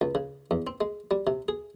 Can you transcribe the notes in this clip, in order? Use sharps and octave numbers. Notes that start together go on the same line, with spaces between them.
C#2
C#3
E2
C4
G#3
G3
C3
G#4